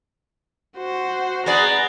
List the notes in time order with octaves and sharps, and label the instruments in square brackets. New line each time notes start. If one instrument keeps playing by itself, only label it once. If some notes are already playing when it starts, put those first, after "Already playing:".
[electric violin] F#4 C5
[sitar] B3 G#4 D5 [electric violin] A#5